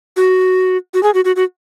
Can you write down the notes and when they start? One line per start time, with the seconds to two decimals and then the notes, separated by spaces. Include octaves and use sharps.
0.17 F#4
0.94 F#4
1.03 G#4
1.14 F#4
1.25 F#4
1.36 F#4